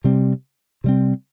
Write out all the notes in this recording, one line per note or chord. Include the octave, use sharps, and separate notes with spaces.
C3 G3 C4
C3 G3 C4